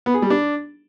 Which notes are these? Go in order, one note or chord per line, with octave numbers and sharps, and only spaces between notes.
B3
G#4
G3
D4